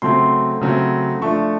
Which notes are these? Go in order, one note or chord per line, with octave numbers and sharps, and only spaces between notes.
C#3 F#3 A3 C4 C6
C#3 F#3 A3 C4
F3 A3 D4 C#6